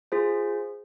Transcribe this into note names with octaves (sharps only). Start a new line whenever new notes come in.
F4 G#4 C5